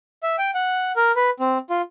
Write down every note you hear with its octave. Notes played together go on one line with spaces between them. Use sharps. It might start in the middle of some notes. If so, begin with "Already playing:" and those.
E5
G5
F#5
A#4
B4
C4
F4